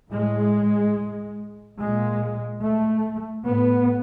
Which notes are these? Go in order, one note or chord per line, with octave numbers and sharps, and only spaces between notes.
A2 G#3
A#2 G#3
A3
A2 B3